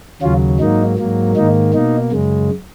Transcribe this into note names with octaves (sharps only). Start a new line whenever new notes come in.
D#2 C#3 F#3 C#4 F4
G#2 F#3 A#3 D#4
G#2 F#3 A#3
G#2 D#3 A#3 D#4
B2 A#3 D#4
F#2 C#3 G#3